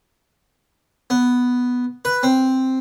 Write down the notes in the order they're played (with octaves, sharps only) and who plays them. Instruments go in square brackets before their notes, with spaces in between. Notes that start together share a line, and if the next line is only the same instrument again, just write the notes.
[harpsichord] B3
B4
C4